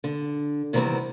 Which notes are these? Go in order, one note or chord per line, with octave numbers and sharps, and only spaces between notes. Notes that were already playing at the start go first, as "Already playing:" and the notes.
D3
C3 D#3 E3 G3 B3 C4